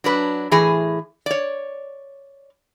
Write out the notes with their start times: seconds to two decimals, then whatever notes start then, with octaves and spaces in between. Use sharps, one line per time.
0.04 F#3 D4 B4
0.51 A2 E3 G#4 G#5
1.26 C#5 D5